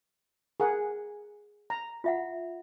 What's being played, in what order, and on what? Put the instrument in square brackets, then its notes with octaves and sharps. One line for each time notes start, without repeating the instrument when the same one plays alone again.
[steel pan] G#4 A#4 F#5
A#5
[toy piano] F4 E5 F#5